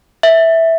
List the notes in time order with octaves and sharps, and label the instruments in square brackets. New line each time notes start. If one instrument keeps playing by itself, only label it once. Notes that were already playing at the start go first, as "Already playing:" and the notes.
[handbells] E5